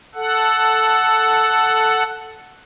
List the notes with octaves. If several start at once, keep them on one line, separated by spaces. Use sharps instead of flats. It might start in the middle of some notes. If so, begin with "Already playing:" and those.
A4 F#5